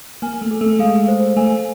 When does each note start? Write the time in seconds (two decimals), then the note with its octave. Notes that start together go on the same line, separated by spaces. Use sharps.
0.22 A#3 G#5
0.42 A3
0.51 A4
0.61 A3
0.79 G#3 F5
1.08 C5
1.37 A3 G#5